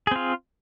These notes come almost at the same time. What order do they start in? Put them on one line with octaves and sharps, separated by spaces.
G#4 C4 F4